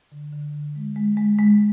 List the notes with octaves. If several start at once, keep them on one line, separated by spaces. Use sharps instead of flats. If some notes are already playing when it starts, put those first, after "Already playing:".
D3
D3
D3
G#3
G#3
G#3
G#3